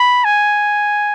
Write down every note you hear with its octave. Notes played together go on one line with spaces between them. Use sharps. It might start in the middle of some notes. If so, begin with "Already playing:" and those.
Already playing: B5
G#5